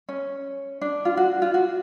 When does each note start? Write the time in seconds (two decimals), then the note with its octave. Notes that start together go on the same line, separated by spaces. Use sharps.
0.09 C#4
0.81 D4
1.05 F4
1.17 F#4
1.42 F4
1.54 F#4